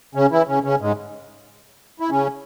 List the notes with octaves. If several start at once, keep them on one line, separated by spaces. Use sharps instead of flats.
C#3 C#4
E3 E4
C#3 C#4
C#3 C#4
G#2 G#3
E4
C#3 C#4